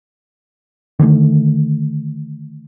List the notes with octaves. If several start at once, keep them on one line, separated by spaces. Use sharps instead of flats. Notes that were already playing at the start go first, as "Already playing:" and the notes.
D3 D#3 G3 A3